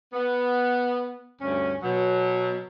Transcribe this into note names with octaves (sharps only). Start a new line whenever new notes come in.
B3
D2 G2 C#4
B2 F#3